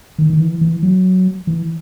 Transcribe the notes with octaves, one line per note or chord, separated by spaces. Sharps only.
D#3
D#3
E3
E3
F#3
E3